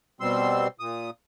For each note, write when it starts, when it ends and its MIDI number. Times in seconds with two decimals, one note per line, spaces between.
0.21 0.68 47
0.21 0.68 55
0.21 0.68 60
0.21 0.68 84
0.21 0.68 88
0.80 1.10 46
0.80 1.10 87